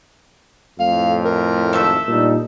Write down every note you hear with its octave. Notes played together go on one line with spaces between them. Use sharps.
F2 A2 A3 F5
A#4
G#1 A3 A4 E5
A#2 G3 D4 D#4